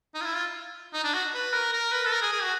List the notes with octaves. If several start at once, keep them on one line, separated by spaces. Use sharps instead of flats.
D#4
F4
E4
F4
D#4
D4
F#4
B4
A#4
A#4
B4
A4
A#4
G#4
G#4
F#4